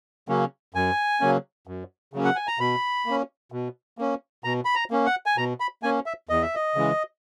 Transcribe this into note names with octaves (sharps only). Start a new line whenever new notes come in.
C#3 F#3 A#3 C#4
F#2 G#5
C#3 F#3 A#3 C#4
F#2
C#3 F#3 A#3 C#4
F#5
G#5
A#5
B2 B5
A#3 C#4
B2
A#3 C#4
B2 A#5
B5
A#5
A#3 C#4
F#5
G#5
B2 A#5
B5
A#3 C#4 G#5
E5
E2 D#5
E5
D#5
C#3 E3 G#3